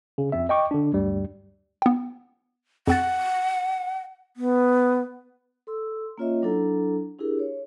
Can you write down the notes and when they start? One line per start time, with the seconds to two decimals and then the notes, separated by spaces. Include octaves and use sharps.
0.18 C#3
0.32 F2 C4 E5
0.49 D#5 G5 C#6 D6
0.71 D3 D4
0.93 D2 G2 G3
1.82 B3 G5
2.87 F2 C4 F#5 A6
4.37 B3
5.67 A4 C6 E6
6.18 A#3 C#4 F4 C#5 D#5 E5
6.42 F#3 D4 E4 A4 A#5
7.19 D4 E4 G4 G#4 A#4
7.39 C#5